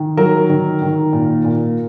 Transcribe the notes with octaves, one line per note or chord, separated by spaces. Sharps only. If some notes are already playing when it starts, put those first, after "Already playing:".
Already playing: D#3
F#3 A#4
D#3
D#3
A#2
A#2